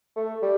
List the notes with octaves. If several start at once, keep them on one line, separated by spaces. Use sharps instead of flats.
A3
G3